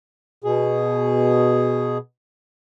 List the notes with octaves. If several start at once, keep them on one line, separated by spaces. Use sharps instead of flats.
B2 G#4